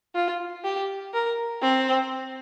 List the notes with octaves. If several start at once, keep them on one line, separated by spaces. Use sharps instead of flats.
F4
G4
A#4
C4